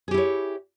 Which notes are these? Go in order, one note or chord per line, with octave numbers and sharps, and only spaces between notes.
E4 G4 G#4 C#5